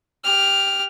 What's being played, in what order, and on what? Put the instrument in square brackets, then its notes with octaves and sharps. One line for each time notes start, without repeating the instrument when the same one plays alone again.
[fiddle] G4 F6